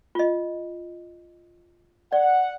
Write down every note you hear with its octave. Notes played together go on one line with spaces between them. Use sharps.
F4 D#5
D5 F#5